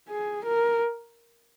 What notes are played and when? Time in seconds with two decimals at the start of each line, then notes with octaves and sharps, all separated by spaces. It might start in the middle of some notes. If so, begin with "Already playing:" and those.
0.10 G#4
0.45 A#4